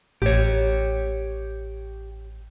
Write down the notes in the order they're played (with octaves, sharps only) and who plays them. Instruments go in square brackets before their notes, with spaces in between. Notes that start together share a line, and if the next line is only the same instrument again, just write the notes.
[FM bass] A1 [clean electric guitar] G4 C#5